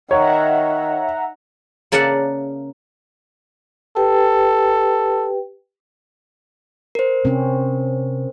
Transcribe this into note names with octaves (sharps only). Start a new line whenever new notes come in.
D#3 C#5 E5 F#5 A#5
C#3 A#3 D5 E5 F#5 A5
G4 A4 B4 G5
A#4 C5
C3 C4 C#4